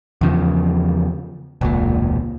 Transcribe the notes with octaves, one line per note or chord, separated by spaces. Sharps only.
E2 C#3 F3
E1 C#2 A#2